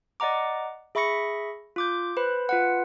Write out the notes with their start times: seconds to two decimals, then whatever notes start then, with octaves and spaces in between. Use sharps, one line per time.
0.20 D5 D#5 F#5 A#5 D6
0.95 G#4 E5 B5 C#6 A#6 C#7
1.76 F4 D6 G6
2.17 B4 C5 B5
2.49 F4 B4 F#5